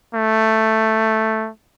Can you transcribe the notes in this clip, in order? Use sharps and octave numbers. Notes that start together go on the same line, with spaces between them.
A3